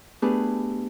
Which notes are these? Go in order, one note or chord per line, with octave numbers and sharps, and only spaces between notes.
A3 B3 D4 G4 G#4 B4